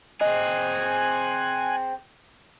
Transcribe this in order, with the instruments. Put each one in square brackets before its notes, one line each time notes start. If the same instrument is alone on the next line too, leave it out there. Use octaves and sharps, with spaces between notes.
[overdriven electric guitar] C4 G#4 [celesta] D#5 [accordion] G#5 F#6